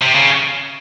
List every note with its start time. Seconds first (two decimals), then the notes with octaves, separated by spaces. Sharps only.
0.01 C3
0.15 C#3